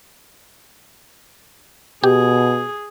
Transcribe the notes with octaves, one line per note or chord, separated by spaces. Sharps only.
B2 G4 G#4